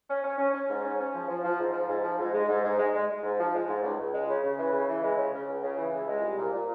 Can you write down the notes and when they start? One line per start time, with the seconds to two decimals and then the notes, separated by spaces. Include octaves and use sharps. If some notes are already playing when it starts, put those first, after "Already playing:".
0.09 C#4
0.23 C#4
0.38 C#4
0.53 C#4
0.68 G#2
0.83 C#4
0.99 C#4
1.13 F3
1.28 F3
1.44 F3
1.59 G#2
1.73 F3
1.88 G#2
2.03 F3
2.18 G#2
2.33 G#3
2.49 G#2
2.63 G#2
2.78 G#3
2.93 G#3
3.09 G#3
3.23 G#2
3.38 F3
3.53 G#3
3.68 G#2
3.82 C#2
3.97 C#2
4.12 G#3
4.28 C#3
4.43 C#3
4.57 E3
4.72 C#3
4.88 E3
5.02 G#3
5.18 C#3
5.33 C#3
5.47 C#2
5.63 C#3
5.77 E3
5.92 C#2
6.08 G#3
6.22 C2
6.37 A#2
6.53 A#2